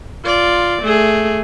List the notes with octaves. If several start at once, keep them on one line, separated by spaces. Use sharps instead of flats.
F4 D5
A3 G#4